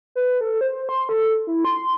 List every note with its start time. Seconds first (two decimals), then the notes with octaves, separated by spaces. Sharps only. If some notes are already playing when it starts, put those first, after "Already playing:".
0.15 B4
0.41 A4
0.61 C5
0.89 C6
1.09 A4
1.47 E4
1.65 C6